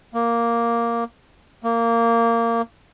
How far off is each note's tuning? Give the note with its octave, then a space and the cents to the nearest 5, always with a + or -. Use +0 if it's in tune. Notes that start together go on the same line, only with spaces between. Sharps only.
A#3 +0
A#3 -15